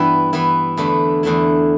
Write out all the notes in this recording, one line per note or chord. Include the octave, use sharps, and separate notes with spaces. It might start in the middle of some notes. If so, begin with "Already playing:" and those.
Already playing: G2 E3 G3 B3 D4 E4
E3 B3 E4
E2 D3 A3 E4
E2 D3 A3 E4